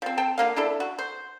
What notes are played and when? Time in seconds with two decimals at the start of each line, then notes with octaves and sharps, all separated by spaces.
0.02 F3 C4
0.18 C4 G5 A5
0.38 D3 A#3 F5
0.56 D4 E4 A4
0.80 F#4
0.99 C5